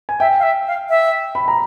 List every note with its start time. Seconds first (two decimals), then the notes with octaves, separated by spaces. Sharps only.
0.09 G#5
0.20 E5 G5
0.39 F5
0.43 E5
0.67 F5
0.89 E5
1.35 B5
1.48 A#5